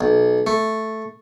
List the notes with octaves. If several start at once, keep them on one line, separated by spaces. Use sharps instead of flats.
B1
A3